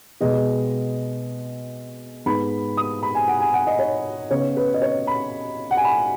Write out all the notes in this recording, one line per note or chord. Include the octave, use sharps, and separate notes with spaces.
B2 G#3 B3 D#5
G#2 G#3 B3 B5
D#6
B5
G#5
F#5
G#5
F#5
D#5
C#5
C#3 B3 C#5
B4
D#5
C#5
B5
F#5
G#5
B5